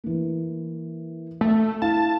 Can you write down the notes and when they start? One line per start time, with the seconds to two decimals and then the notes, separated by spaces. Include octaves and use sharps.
0.04 E3 A#3
1.41 A3
1.82 E4 F5 A5